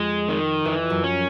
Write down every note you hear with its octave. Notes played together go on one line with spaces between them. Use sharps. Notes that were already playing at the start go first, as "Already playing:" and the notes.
Already playing: F2 G#3
D#3
F2 E3
F#2
C#4